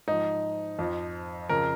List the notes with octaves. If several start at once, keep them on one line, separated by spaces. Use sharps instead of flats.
G#2 F3 D#4
F2 F3
F2 C#3 F3 A#4